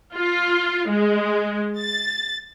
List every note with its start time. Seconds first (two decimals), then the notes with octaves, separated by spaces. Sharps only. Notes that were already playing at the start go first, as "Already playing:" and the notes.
0.15 F4
0.90 G#3
1.77 A6